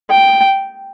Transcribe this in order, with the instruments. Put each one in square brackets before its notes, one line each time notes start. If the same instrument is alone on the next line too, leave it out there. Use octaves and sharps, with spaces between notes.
[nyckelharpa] G5